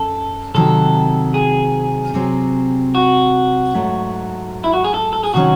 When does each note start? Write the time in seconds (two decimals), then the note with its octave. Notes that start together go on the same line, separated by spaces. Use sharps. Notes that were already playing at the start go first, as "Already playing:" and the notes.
Already playing: F#2 A4
0.54 C3 D#3 F#3 C4 A4
1.34 G#4
2.14 C3 F#3 C4
2.95 F#4
3.74 G#2 F#3 A3
4.64 E4
4.74 F#4
4.84 G#4
4.94 A4
5.13 A4
5.24 G#4
5.34 C3 D#3 F#3 C#4 F#4